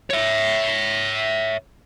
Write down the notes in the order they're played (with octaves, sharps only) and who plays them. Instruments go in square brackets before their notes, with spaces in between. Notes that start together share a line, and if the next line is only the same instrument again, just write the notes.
[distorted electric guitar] C#5 E5